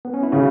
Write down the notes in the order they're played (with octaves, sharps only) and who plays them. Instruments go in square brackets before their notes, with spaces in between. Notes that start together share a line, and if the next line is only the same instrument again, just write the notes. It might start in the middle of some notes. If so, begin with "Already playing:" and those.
[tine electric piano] B3
C#4
E4
[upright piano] C#3 [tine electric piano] C#4 F#4